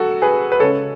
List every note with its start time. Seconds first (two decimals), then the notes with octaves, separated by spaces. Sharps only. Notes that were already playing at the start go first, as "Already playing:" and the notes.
Already playing: F#3 F#4 A4
0.22 G#4 B4
0.52 B4
0.60 C#3 G#3 A4 C#5